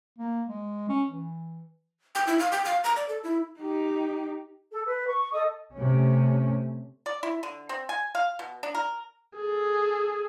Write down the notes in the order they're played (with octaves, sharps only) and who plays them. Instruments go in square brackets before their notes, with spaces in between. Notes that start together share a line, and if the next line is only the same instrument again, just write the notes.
[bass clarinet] A#3
G#3
C#4
E3
[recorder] G5
E4
F5
G5
F5
A#5
D5
A4
E4
[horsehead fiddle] D#4 G4
[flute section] A4
B4
C#6
A4 D#5 D#6
[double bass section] C3 A3 C#4
[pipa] D5
E4
D3
C4
G#5
F5
B2
D4
A#4
[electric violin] G#4 A4